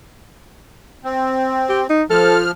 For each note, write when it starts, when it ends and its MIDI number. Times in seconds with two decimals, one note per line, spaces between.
1.04 1.87 60
1.69 1.82 67
1.89 2.03 63
2.10 2.51 53
2.10 2.40 69
2.10 2.51 89